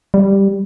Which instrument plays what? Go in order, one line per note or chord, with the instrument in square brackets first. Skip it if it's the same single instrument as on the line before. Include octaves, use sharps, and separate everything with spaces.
[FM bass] G3